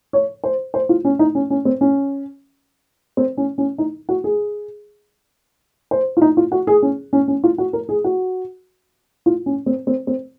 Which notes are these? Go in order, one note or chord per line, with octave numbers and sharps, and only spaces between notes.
C#5
C5
C5
F4
C#4
D#4
C#4
C#4
C4
C#4
C4
C#4
C#4
D#4
F#4
G#4
C5
F4
D#4
F4
F#4
G#4
C#4
C#4
C#4
F4
F#4
A#4
G#4
F#4
F4
C#4
C4
C4
C4